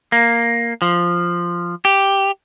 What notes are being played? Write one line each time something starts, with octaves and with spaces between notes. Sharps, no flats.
A#3
F3
G4